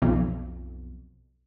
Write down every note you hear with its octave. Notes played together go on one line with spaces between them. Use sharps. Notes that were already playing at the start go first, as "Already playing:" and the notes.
B1 F2